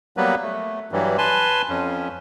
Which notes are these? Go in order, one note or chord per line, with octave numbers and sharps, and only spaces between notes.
F#3 G3 A#3 B3 B4
A3
G2 E3 F#3 G3
B4 G#5 A5 C6
F2 C#4